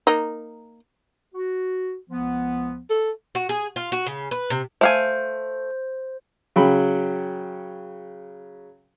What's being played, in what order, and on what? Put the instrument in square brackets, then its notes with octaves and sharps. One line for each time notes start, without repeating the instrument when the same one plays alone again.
[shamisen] A#3 D#4
[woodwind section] F#4
C#2 F3 B3
[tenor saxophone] A4
[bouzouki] F#4
G#4
F4
F#4
C#3
B4
C3
[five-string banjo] A3 F5 G#5 [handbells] C5
[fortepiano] C#3 F#3 G5 B5